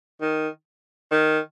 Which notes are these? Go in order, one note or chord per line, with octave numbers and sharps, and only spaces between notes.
D#3
D#3